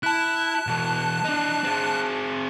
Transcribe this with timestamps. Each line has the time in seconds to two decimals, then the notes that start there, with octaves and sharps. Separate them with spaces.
0.03 E4 A5 F#6
0.67 B2 E3
1.24 D4 D#4
1.64 C4 G#4